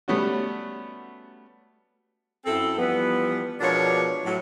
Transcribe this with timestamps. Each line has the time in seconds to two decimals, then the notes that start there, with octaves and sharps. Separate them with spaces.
0.08 G3 A3 B3 C#4 F#4
2.46 F#2 C4 E4 A4
2.78 E3 F3 G3 B3
3.61 B2 F3 G#3 D4 A#4 C#5
4.25 A2 F#3